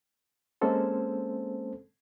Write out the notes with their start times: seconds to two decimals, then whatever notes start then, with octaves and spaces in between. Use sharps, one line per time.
0.61 G#3 A#3 C4 C#4 A4 C5